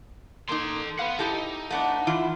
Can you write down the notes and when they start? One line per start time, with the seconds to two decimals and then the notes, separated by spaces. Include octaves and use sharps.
0.49 A#3 D#4 A4 C6
0.99 B4 F5 F#5
1.19 D#4 E4 G4 A4
1.71 A3 B3 D4 F#5
2.07 E3 E4 F4